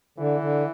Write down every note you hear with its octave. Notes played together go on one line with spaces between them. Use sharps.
D3 E3
D3